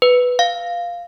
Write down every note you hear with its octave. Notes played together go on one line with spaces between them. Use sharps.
B4
F5